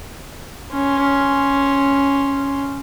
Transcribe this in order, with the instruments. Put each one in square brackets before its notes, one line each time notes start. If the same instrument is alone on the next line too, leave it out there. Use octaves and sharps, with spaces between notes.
[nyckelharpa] C#4 C6